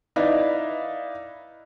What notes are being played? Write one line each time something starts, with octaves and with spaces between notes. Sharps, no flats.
D#4 E4 B4 D5 E5 F5